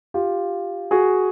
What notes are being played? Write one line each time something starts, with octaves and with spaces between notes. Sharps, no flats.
F4 G4
F#4 G#4